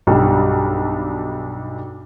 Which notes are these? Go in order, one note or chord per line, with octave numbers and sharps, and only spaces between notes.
B1 G2 G3